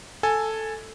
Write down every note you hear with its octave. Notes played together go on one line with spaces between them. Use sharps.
A4 G#5